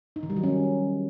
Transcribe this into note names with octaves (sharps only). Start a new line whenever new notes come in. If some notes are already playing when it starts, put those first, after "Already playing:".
D#4
D#3
G3
F#3
C#4